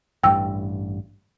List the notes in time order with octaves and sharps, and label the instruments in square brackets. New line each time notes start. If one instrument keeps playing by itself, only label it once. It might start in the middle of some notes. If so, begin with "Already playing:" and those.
[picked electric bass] A1 G2 [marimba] G5 E6